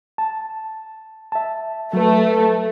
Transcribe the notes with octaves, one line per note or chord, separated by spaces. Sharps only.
A5
E5 A5
F#3 A3 B4